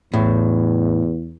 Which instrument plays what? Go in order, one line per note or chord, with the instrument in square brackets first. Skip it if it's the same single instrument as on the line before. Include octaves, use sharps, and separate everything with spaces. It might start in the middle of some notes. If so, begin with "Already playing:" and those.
[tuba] E2 [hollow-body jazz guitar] A2